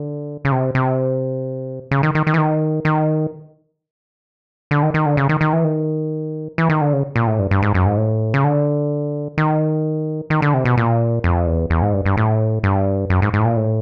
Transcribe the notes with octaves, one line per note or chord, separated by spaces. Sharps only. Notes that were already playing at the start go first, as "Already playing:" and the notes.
Already playing: D3
C#3
C3
C3
C#3
D#3
D#3
D#3
E3
D#3
D#3
D3
D#3
D#3
D3
C#3
D#3
D#3
E3
D#3
E3
D#3
D3
C#3
A#2
A2
G2
G2
G#2
F#2
G#2
A2
C#3
D3
D#3
D#3
D3
C3
B2
A#2
F2
E2
E2
G#2
G2
G2
A2
G2
F#2
G#2
G#2
A2
A#2
A2